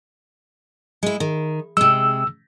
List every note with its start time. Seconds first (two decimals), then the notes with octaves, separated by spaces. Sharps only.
1.03 G#3 E4
1.20 D#3
1.77 C3 G#3 E6